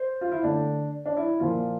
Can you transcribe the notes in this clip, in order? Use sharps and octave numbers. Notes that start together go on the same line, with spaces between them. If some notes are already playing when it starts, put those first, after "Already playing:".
Already playing: C5
F4
E4
D3 A3 D4
D4
E4
A#2 F3 A#3 F4